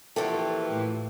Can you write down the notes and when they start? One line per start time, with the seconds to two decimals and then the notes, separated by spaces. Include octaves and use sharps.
0.16 A#2 E3 F3 F#4 G4 A4
0.69 A2